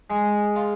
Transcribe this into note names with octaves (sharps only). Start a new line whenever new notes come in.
G#3
F4